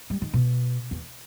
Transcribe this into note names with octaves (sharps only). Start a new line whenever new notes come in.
G3
D#3
B2
E2